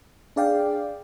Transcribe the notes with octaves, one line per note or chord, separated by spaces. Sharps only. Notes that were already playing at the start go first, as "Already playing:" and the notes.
D4 G#4 D5 F5 G5